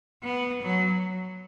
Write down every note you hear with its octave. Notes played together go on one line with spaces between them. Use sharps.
B3
F#3